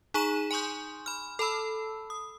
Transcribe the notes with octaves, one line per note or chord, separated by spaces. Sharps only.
D#4 G#4 A#5 C#6 D#7 E7
G#5 C6 C#6 D#6 G6
B5 F6
A4 A5 B5 E6
D#6